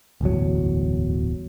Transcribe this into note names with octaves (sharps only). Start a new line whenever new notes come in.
D1 G1 E2 F#3